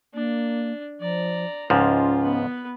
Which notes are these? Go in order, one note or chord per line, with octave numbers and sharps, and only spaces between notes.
A#3 D4
F3 D5 A#5
C#2 G#2 F3 C#4 F4
B3 B4